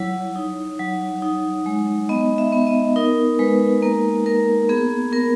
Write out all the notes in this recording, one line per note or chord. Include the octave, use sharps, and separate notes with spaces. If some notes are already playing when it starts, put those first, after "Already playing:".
Already playing: F#3 E4 C#5
D#4
F#3
D#4
G#3
B3 D#5
E5
B3
D#5
D#4 A#4
G#3 B4
A#3 A#4
A#3 A#4
B3 G#4
B3 A#4